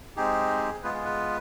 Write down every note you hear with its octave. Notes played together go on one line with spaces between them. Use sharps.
G#3 C4 D#4 G4 G#4
G#3 B3 F4 G#4 B4
G#4
B4